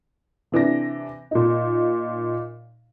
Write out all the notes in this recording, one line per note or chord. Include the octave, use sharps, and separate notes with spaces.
C3 E3 D4 A#6
A#2 D#4